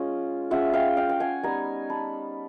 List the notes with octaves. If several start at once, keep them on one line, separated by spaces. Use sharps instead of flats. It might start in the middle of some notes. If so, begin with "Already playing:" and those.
Already playing: G#3 C#4 F4
G#3 C#4 F4 E5 F#5
F5 G5
F5 G5
G5
F#5 G#5
G3 B3 D#4 G#5 A#5
A5 B5